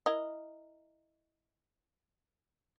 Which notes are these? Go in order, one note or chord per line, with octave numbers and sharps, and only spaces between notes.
E4 A#4 D#5